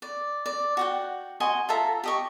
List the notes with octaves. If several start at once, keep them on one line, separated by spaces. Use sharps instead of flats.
D5
D5
F#4 F#5 G5
F#4 D#5 G#5 C6
F4 A4 E5 A#5
G4 D#5 C#6